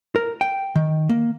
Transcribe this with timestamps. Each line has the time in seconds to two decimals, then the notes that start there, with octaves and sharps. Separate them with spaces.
0.16 A#4
0.41 G5
0.76 D#3
1.09 A#3